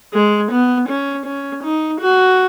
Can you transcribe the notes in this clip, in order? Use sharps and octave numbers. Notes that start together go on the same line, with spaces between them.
G#3
B3
C#4
C#4
D#4
F#4